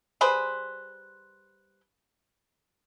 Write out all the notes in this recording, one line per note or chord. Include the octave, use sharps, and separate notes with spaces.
G3 G#4 B4 C5